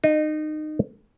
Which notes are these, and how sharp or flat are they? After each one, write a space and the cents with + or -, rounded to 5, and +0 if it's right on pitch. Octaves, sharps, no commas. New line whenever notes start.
D#4 -25